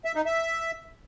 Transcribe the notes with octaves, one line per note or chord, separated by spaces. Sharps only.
E5
D#4
E5